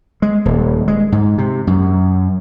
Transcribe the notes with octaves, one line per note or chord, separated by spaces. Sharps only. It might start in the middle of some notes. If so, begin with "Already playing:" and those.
G#3
D#1
G#3
G#2
C3
F#2